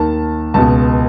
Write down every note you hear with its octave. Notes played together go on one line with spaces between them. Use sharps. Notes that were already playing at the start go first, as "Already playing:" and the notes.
Already playing: D#2 D#3 A5
C#2 B2 A5